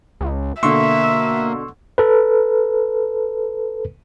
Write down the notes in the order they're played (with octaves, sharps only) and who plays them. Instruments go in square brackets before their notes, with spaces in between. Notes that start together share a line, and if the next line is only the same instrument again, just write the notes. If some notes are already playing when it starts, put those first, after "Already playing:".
[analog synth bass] C#2
[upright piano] B2 D3 [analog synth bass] A#3 [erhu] E5 [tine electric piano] C6 C#6 E6
[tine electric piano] A4 B4